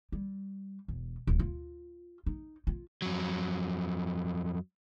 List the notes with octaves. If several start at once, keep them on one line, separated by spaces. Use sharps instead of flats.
G3
E1
D1
F4
D#4
F4
F2 F#3